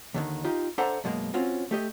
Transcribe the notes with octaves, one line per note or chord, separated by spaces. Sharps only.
D#2 D3 D#3
D#4 F4 G4
D4 A4 C5 E5 F#5 A#5
F#2 B2 G#3 A#3
C4 C#4 F4 F#4
A3 G4 D#5